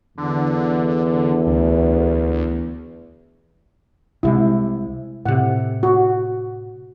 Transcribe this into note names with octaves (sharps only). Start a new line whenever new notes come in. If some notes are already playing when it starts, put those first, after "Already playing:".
E2 D3
D2
C2 C3 G#3 E4
A2 C3 F#5
F#4